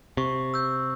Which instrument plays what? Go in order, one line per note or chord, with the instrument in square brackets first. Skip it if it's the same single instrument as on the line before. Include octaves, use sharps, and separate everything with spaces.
[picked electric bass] C3 [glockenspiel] C#6
[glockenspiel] E6 G6